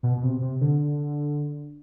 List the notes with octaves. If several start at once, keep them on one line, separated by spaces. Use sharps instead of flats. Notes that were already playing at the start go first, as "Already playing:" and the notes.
B2
B2
C3
C3
D3